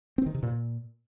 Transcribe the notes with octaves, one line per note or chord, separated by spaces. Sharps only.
C4
D#3
C3
A#2